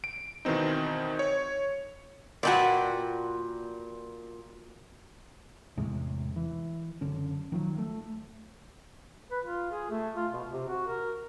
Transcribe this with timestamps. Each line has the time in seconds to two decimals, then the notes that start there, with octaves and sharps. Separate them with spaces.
0.04 D7
0.45 B2 D#3 E3 C4 D#4
1.19 C#5
2.43 A#2 F#4 B4 D5 G5 G#5
5.77 E2 A2 C3 G#3
6.36 E3
7.01 F#1 D3 C#4
7.52 D#3 F3 F#3
7.78 A3
9.31 B4
9.45 F4
9.72 G#4
9.91 A3
10.16 F4
10.33 B2
10.49 C3
10.69 F#4
10.88 A#4